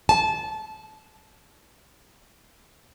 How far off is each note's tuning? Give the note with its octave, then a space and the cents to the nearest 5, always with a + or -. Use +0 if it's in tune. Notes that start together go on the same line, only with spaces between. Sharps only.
A5 -20